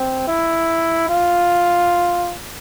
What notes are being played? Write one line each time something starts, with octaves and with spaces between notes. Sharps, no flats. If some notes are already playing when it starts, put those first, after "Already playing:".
Already playing: C4
E4
F4